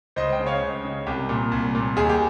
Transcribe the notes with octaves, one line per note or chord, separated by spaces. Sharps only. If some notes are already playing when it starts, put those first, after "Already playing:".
C#2 C5 D#5
D#5 G5
C#3
C#5 F5
C#2
C#3
C2 G4
A#2
C2
A#2
D#2 G#4
G4